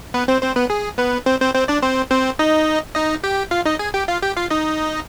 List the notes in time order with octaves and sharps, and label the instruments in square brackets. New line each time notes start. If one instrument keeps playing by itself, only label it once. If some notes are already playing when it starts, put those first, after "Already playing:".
[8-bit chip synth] B3 B4
C4 C5
C4 C5
B3 B4
G#4
B3 B4
C4 C5
C4 C5
C4 C5
D4 D5
C4 C5
C4 C5
D#4 D#5
D#4 D#5
G4 G5
F4 F5
D#4 D#5
G#4 G#5
G4 G5
F4 F5
G4 G5
F4 F5
D#4 D#5